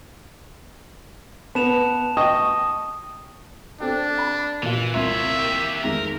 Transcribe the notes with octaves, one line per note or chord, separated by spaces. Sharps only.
B3 A5 E7 F7
D#5 G5 C#6 D#6
C4 D4 A4 G5
B5
A#2 E3 F4
C2 F4 C#5 E5 C6
A#3 G4
F2 D#3 G#3 A#4